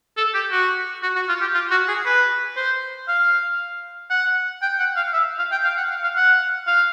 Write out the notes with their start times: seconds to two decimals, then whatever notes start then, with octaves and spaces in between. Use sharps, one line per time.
0.17 A4
0.34 G4
0.51 F#4
1.03 F#4
1.16 F#4
1.29 F4
1.41 G4
1.54 F4
1.71 F#4
1.88 G#4
2.05 B4
2.56 C5
3.08 F5
4.10 F#5
4.62 G5
4.79 F#5
4.96 F5
5.13 E5
5.39 F5
5.52 G5
5.64 F5
5.78 F#5
5.91 F5
6.03 F5
6.16 F#5
6.67 F5